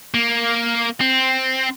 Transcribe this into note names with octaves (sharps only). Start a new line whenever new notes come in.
A#3
C4